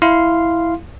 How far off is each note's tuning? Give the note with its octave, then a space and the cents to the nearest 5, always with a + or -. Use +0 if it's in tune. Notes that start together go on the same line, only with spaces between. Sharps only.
E4 +0 F5 -5 C6 -5